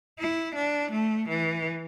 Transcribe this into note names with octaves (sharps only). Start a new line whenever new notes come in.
E4
D4
A3
E3